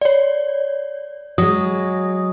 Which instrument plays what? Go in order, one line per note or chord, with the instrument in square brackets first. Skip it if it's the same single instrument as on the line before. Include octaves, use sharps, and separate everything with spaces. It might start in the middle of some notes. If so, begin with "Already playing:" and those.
[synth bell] C#5 D5
[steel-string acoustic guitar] F#3 G#3 [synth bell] D#6